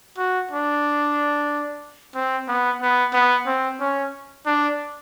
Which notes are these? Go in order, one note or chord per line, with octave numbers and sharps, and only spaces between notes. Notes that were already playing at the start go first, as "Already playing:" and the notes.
F#4
D4
C4
B3
B3
B3
C4
C#4
D4